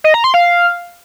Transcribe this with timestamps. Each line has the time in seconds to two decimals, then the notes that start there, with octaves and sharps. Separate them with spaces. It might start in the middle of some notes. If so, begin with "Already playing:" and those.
0.04 D#5
0.14 A#5
0.24 C6
0.34 F5